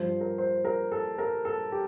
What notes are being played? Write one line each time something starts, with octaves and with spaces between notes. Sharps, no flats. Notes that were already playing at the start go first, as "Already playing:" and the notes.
Already playing: G2 F3 C5
A#4
C5
A#4
A4
A#4
A4
G4